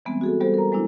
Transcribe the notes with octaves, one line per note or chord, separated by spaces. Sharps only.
E3 G3 G#3 B3 C4
F#4 G#4 A4
G3 B3 G4 A4 C5
A#4 A#5
F#3 G#3 B3 D4 E4